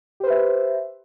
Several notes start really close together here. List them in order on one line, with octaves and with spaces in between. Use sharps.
G4 C5 B4 E5